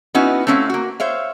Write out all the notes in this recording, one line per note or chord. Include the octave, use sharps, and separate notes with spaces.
B3 C#4 D#4 E4 F#4
A3 C4 C#4 D#4 E4 F5
A#3 F#4
C5 C#5 E5 F5